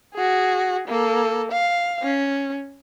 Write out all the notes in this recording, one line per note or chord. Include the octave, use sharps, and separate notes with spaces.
F#4 G#4
A#3 A4
F5
C#4